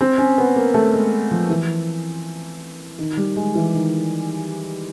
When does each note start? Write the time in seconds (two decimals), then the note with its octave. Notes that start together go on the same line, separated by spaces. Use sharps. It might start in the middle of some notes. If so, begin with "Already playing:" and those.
0.01 C4
0.18 C#4
0.38 B3
0.56 A#3
0.74 A3
0.93 G#3
1.31 F3
1.50 E3
2.98 D#3
3.17 G3
3.36 G#3
3.55 E3
3.74 D#3